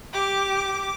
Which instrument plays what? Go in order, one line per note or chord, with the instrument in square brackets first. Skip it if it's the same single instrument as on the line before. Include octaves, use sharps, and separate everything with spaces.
[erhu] G4 [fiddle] D6